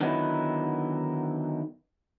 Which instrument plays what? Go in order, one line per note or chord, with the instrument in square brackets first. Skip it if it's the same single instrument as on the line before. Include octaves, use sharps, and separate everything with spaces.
[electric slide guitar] D3 D#3 F#3 B3 D#4 E4